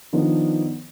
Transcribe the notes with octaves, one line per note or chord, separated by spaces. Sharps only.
D#3 F3 B3 D4